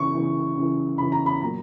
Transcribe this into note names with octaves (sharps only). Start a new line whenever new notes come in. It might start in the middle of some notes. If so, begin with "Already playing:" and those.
Already playing: C#3 E3 C#6
C#3 E3
C#3 E3
C#3 E3 B5
A#5
B5
A#2 F#3 A#5